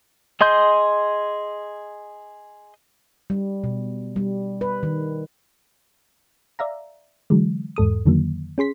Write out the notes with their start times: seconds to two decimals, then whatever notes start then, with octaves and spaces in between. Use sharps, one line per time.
0.41 G#4 D#5 C6 G6
3.30 G3
3.64 B2
4.16 G3
4.61 B4
4.83 D#3
6.59 D5 E5 F5 A#5
7.30 D3 E3 F#3 G#3
7.76 E2 G#2 A4 D#6
8.06 F2 D3 D#3 F#3 A#3
8.58 C#4 G#4 C6 B6